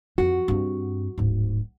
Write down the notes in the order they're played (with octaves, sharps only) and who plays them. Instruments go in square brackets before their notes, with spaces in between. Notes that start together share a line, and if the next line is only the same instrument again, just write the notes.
[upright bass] F2 F3 [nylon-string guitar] F#4
[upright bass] G2 C4
D1 G#2